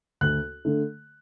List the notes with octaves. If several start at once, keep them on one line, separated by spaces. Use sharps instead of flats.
D2 F#6
D3 A3